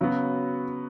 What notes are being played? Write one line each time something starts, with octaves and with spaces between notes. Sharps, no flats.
C#3 F#3 B3 F#4